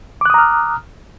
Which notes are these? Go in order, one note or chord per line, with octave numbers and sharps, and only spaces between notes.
A#5 D6 D#6 F6 F#6